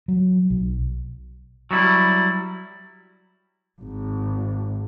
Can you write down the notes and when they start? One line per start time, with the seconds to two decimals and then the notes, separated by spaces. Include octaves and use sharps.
0.08 F#3
0.50 B1
1.71 F#3 G3 E4
3.80 G#1